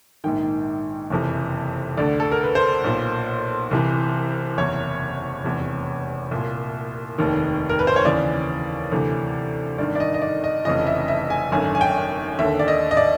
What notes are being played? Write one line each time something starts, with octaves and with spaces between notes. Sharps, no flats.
A#1 G#2 D#3 G5
F#1 F2 C3 E3
D2 D3 D5
A4
A#4
B4
C5
B1 A#2
C2 C3 E3
F#1 E2 C3 C#5
F1 E2 C3
C2 A#2
F1 D#2 D#3
A#4
B4
C5
C#5
D#2 C#3 E3 D5
D2 C3 E3
G#1 G2 D#3 D5
D5
D#5
D#5
D5
D#5
F1 F2 C#3 E3 D#5
E5
E5
G#5
G#1 F#2 D3 G#5
G#5
G5
D#2 D3 E5
D5
D#5
D#5
D5